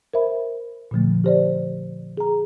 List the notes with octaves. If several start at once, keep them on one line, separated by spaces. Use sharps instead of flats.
A#4 C5 E5 B5
A#2 D3 F3 A3
G4 C5 D5
G#4 A#5